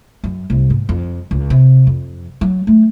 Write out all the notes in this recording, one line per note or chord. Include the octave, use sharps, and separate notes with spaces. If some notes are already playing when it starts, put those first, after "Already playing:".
F#2
C2
G#2
F2
C#2
C3
F2
F#3
A3